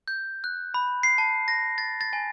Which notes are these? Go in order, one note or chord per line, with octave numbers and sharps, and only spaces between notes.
G6
F#6
B5
C7
A5
A#6
A6
A6
G#5